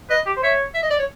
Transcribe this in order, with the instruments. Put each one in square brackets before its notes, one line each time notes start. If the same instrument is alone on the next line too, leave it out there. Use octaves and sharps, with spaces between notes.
[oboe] B4 [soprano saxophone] D#5
[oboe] G4
C5
[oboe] C#5 [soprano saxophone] E5
[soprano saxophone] E5
D#5
D5
C#5